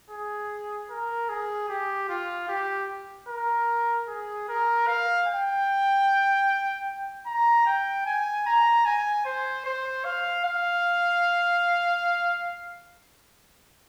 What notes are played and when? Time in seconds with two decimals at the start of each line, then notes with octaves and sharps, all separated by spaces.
0.10 G#4
0.90 A#4
1.29 G#4
1.69 G4
2.09 F4
2.49 G4
3.28 A#4
4.08 G#4
4.48 A#4
4.87 F5
5.28 G5
7.26 A#5
7.66 G5
8.06 G#5
8.46 A#5
8.85 G#5
9.25 C5
9.65 C5
10.04 F5
10.45 F5